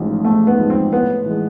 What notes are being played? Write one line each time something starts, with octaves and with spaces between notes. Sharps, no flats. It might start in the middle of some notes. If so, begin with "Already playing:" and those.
Already playing: A1 G#2 F3
A1 A3
B3
G#2 F3
C4
A2 B3
E3 G#3